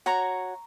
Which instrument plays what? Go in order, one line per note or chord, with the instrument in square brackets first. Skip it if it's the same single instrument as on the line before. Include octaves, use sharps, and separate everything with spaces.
[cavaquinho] F#4 C#5 A#5 C#6